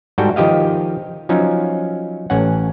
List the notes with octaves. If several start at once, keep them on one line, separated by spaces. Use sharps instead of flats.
G#2 G3 F#4 A4 G5
D#3 F3 G4 D#5 F5
F3 F#3 C#4 D#4
A1 C#4 F#5